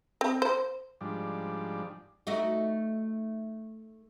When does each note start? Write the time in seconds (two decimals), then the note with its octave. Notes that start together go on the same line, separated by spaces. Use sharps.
0.21 C4
0.42 C5
1.01 G#2 F3 G3 D4
2.27 A3 D#4 F#4